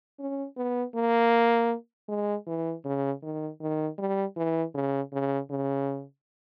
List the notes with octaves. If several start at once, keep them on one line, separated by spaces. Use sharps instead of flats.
C#4
B3
A#3
G#3
E3
C#3
D#3
D#3
G3
E3
C#3
C#3
C#3